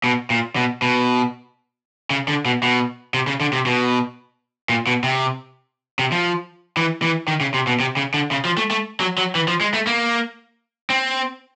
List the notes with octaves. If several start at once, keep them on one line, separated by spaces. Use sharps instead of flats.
B2
A#2
B2
B2
C#3
D3
B2
B2
C3
C#3
D3
C3
B2
A#2
B2
C3
C3
F3
E3
E3
D#3
C#3
C3
B2
C3
C#3
D3
C#3
F3
A3
A3
F#3
F#3
E3
F3
G#3
A3
A#3
C4